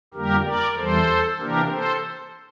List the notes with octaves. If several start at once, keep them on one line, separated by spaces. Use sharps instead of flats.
F2 D3 G3 A#3 G4 A#4
A#4 D5
E2 E3 G3 A4 C5
C3 E3 A#3 D4 G4 A#4
A4 C5